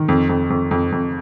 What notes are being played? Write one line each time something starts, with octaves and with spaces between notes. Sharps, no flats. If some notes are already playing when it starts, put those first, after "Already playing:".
Already playing: D#3
F2
F2
F2
F2
F2